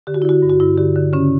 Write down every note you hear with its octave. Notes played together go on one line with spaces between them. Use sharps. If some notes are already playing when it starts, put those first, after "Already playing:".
D3 G4
F#4
E4
D3 F#4
G2
F#4
G2 E4
D3 G4
D3
C#3 C#4